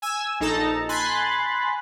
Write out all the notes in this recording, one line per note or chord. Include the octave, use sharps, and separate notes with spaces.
G#5 E6
A#1 D#4 A4 A5 A#5
G#5 B5 C6 F#6 A6